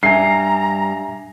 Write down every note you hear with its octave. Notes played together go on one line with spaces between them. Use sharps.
G2 G3 E5 G#5 A#5 C7